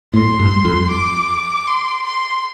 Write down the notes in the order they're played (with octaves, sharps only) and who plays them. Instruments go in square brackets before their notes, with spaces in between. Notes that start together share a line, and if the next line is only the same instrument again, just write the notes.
[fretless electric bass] A2 [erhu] C6
[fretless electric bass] G2
F2
[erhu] D6
C6
C6